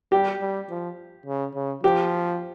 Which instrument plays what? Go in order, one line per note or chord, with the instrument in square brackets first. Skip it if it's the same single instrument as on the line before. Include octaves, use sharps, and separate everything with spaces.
[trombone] G3 [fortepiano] G4
[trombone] G3
F3
C#3
C#3
[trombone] F3 [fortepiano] G4